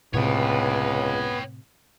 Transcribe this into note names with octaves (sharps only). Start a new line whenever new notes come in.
C#2 A2 C3 B3 C#5 G5